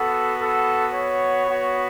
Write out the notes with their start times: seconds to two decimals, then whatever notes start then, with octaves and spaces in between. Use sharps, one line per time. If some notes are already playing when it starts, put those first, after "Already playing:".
Already playing: B3 F#4 A4
0.40 A4
0.94 C#5
1.47 B3 F#4